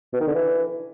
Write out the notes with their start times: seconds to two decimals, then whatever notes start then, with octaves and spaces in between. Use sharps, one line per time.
0.13 B2
0.20 D#3
0.28 D3
0.35 E3